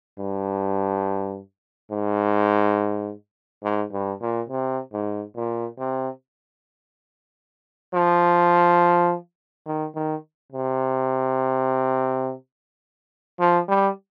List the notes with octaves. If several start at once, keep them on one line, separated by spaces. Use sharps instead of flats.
G2
G#2
G#2
G2
A#2
C3
G#2
A#2
C3
F3
D#3
D#3
C3
F3
G3